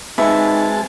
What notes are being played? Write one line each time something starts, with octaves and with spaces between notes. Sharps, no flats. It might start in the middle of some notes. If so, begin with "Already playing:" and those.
G#3 C4 D#4 F#4 B4 E5 A5